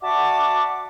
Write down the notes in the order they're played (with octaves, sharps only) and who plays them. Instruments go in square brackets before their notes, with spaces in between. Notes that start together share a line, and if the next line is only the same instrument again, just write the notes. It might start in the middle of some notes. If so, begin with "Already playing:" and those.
[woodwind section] F#4 D5 E5 F#5 A5 D6